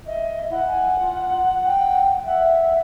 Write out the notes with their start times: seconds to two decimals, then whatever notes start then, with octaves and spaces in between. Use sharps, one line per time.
0.06 D#5 E5
0.50 E4 F#5
0.66 G#5
1.00 F4
1.66 G5
2.25 E5 F#5